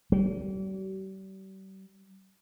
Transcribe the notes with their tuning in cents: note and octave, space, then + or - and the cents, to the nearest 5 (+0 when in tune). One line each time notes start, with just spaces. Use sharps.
G3 -40